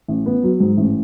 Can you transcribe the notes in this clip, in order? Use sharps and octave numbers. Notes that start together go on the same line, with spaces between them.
A1
B3
F#3
G#2
A1